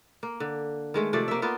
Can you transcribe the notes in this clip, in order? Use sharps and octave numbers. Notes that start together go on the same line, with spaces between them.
A#3
D3
D#3 G#3 A3
C3 F3 A3 D5
A#3 E5
A#3 B3 F4